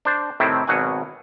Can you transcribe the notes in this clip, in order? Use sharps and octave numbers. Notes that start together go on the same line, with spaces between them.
D4 C5
A2 C3 D#3 A3 C4 E4
G#1 B2 F#3 F#5 G#5